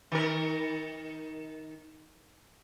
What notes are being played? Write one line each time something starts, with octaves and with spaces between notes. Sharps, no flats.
D#3 A#4